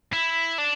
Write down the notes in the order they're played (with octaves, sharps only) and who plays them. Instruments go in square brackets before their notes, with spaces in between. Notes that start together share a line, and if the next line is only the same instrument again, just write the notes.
[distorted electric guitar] E4
D4